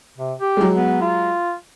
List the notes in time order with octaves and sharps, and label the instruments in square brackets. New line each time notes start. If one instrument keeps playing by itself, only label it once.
[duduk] C3
G4
[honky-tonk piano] F#3 G#3
[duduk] B3
F4